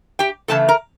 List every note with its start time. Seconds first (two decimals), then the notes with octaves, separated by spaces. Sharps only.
0.19 G4 G5
0.48 C#3 E3 A3 A4 A5
0.69 A#4 A#5